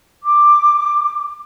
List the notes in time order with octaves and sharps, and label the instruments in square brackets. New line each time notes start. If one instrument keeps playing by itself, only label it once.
[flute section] D6